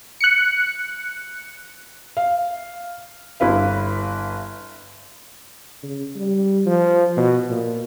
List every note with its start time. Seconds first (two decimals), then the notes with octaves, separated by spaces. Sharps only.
0.21 F#6 C#7
2.17 F5
3.40 G1 E4 B4 F5
5.83 C#3
6.16 G3
6.66 F3
7.17 B2
7.50 A#2